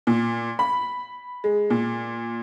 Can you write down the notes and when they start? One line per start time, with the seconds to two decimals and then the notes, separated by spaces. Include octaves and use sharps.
0.07 A#2
0.59 B5
1.44 G#3
1.70 A#2